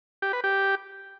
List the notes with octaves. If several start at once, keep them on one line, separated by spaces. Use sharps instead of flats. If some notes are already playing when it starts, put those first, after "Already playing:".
G4
B4
G4